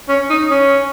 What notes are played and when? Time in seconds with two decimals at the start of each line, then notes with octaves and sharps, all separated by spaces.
0.09 C#4
0.30 D#4
0.51 C#4